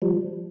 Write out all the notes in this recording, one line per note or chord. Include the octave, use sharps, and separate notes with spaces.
F3 G3